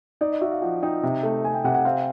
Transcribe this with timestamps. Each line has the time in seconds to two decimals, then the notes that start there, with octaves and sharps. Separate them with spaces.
0.21 D#4 D5
0.32 D#5
0.41 F#4 E5
0.51 F5
0.62 F3 F#5
0.83 D#4 G5
1.03 C3
1.23 A3
1.44 A3 G#5
1.54 G5
1.64 C3 F#5
1.75 F#5
1.85 C4 F5